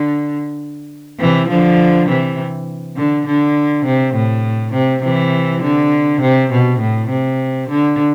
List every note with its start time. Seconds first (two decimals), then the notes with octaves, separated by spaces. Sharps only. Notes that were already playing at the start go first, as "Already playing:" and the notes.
Already playing: D3
1.20 C3 E3
1.49 D3 F3
2.08 C3 E3
2.97 D3
3.27 D3
3.85 C3
4.15 A2
4.73 C3
5.03 C3 E3
5.63 D3
6.21 C3
6.51 B2
6.80 A2
7.09 C3
7.69 D3